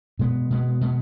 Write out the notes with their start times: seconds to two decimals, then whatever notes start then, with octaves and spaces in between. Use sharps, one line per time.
0.19 B2 G#3 B3
0.50 B2 G#3 B3
0.81 B2 G#3 B3